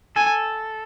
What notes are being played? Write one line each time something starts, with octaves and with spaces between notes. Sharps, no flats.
A4 G#5